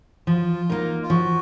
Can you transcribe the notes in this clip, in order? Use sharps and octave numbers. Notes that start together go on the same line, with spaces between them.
F3 F4
A#3 D#4 A#4
F4
F3 F#4